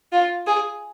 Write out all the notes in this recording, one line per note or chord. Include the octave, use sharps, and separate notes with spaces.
F4
G#4